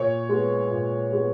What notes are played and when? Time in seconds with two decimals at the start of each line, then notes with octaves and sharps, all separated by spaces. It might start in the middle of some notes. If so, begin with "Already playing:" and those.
Already playing: A#2 C#5
0.29 G#3 B3
0.71 A#2
1.12 G#3 B3